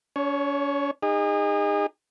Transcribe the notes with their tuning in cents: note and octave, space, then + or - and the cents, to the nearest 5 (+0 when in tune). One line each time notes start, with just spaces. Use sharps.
C#4 +45 C#5 +0
D#4 -10 G#4 -35